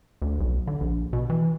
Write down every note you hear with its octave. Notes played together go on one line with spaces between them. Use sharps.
D2
B1
D3
A#1
B2
E3